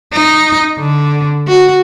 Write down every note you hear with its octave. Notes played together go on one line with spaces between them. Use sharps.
D#4
D3
F#4